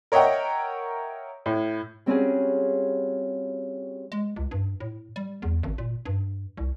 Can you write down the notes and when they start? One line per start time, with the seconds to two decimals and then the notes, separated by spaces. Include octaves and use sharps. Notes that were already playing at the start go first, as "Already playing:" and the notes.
0.12 A#4 C#5 D#5 E5 F#5 G5
1.46 A2
2.06 G3 C4 C#4 F4 F#4 G#4
4.12 G#3
4.36 C#2
4.51 G2
4.80 A2
5.16 G3
5.42 E2
5.63 G#1
5.78 A#2
6.05 G2
6.58 C2